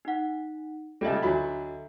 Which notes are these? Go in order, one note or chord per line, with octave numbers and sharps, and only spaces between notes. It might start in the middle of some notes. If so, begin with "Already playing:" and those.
D#4 F#5
C#2 G3 A4 D#5 E5
D2 F#3 B5